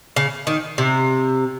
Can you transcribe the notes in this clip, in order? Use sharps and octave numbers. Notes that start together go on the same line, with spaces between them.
C#3
D#3
C3